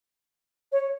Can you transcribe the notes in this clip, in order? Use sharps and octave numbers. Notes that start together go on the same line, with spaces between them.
C#5